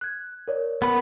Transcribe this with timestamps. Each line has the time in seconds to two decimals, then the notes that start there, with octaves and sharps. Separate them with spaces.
0.01 F#6 G#6
0.48 A#4 C#5 D5
0.82 B3 A#4 B5